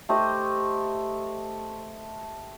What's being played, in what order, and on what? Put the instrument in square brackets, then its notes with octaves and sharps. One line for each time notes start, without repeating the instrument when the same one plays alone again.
[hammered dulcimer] A3 G4 C5 D#5